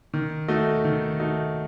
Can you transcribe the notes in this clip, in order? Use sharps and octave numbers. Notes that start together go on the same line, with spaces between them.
D#3
A3 D#4 F#4
D#3
A3 D#4 F#4